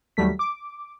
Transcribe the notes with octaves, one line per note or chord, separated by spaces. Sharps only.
D#2 F#3 G3 A3 B6
D6